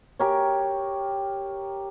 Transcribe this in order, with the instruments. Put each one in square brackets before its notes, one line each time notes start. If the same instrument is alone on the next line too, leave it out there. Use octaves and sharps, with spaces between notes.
[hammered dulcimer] G4 A#4 C#5